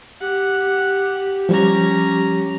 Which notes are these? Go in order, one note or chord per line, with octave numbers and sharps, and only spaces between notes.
G4 F#5
F3 G3 C#4 A#5